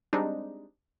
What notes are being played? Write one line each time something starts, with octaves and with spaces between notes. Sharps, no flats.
G3 G#3 C4 D4 D#4